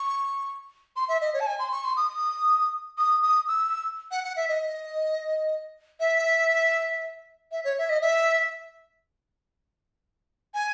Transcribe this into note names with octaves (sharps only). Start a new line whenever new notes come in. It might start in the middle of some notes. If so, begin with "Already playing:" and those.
Already playing: C#6
C6
E5
D#5
C#5
A5
G#5
C6
C#6
C6
D#6
D#6
D#6
E6
F#5
F#5
E5
D#5
E5
E5
C#5
E5
D#5
E5
G#5